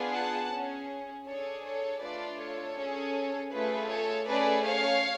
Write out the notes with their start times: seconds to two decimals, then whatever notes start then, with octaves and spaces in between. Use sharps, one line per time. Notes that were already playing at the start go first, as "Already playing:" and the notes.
Already playing: B3 D4 F4 G#4
0.14 F#5 A5
0.52 C#4 G#4
1.26 D4 G#4 A4 C#5
1.64 A4 C#5
2.02 A3 D4 F4 B4 D5
2.39 A4 C#5
2.77 C#4 G#4
3.52 A3 F4 G#4 B4
3.90 A4 C#5
4.27 A3 C#4 G#4 B4 D5
4.65 C#5 F5